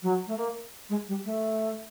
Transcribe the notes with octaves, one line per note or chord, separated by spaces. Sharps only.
F#3
A3
A#3
G#3
G3
A3